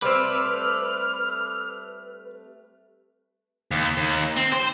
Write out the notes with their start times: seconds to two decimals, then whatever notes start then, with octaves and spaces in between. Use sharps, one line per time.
0.02 G3 A3 C4 B4 D6 E6 F6
3.71 D#2
3.97 D#2
4.36 C4
4.52 C5